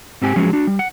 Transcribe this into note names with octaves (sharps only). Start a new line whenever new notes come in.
G#2 C4 G4 G#5
F3 F#3 G#3 C#4 G#4
D4 F#4
G3
F#5